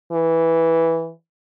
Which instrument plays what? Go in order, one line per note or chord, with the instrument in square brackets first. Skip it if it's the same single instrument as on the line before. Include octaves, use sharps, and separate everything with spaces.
[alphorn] E3